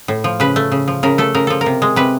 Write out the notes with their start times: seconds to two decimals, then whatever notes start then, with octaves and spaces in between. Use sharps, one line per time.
0.08 A2
0.24 F3
0.40 C#3 B4
0.56 A3
0.72 C#3
0.88 F3
1.03 C#3 A#4
1.18 A3 A4
1.34 C#3 A#4
1.47 F3 A4
1.61 A#4
1.66 C3
1.82 G#3
1.96 C3 B4